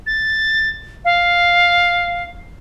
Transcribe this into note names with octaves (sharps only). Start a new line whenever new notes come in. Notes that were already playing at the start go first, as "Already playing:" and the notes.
A6
F5